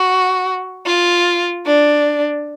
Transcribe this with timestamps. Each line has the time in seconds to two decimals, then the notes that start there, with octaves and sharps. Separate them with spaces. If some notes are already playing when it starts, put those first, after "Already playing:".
Already playing: F#4
0.86 F4
1.66 D4